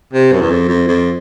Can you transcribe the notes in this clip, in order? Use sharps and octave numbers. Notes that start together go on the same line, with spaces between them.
C3
F#2
E2
F2
F2
F2